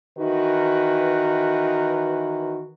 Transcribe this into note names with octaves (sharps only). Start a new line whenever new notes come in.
D#3 E3 F#4 B4